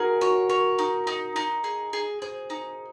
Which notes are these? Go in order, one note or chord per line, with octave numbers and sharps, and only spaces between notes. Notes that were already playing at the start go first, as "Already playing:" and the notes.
Already playing: D#4 F#4 G#4 A#4
F#4 C#5
A#4 C#5
D#4
D#4
D#4
G#4
G#4
G#4 C5
D#4